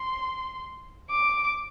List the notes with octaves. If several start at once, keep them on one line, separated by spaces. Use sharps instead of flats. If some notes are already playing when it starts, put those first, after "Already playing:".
Already playing: C6
D6